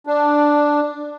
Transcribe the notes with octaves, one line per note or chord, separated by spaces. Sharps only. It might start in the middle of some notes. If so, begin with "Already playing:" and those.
D4